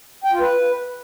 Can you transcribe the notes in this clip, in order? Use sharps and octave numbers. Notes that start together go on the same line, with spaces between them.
G5
F4
B4